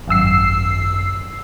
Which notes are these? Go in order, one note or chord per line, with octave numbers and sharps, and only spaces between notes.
G#1 F#2 E6 C7